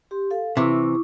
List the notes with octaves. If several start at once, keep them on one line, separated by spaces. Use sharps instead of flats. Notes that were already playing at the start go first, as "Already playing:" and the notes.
G4 C6
A4 F5
C3 E3 E4 C#6 D6